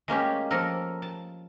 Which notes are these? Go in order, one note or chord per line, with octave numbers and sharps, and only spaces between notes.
G#3 A#3 C#4 G4
F3 A#3 A4 A#4
A5